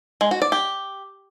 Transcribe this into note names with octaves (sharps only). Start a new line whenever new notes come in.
G#3
F#4
D5
G4